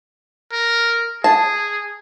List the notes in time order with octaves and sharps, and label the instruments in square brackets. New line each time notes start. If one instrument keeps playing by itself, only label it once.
[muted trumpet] A#4
[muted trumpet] G#4 [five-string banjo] A5